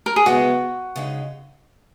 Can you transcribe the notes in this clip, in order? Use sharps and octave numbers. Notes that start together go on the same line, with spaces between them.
A#4
G#4
F#2 C#3 G#3 B3 E4 F#4
C#3 G#3 D#4